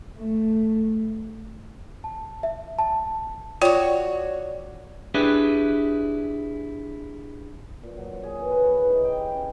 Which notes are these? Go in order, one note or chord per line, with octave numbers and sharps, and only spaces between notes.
A3
A5
E5
A5
F4 F#4 C#5 D5 G5
D4 E4 G4 G#4 B4
A#2
F#3
C5
G#4
E3
B4
C#6
E3
D#4
G5
G4
C#4